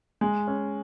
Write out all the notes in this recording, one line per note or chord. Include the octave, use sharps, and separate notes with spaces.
G#3
C#4